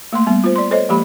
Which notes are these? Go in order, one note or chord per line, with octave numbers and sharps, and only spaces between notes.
A3 A#3 C6
G3 B3
F4 C5
D5 C6
A4 C5 C#5 D#5
F3 G#3 A#3 G4 B5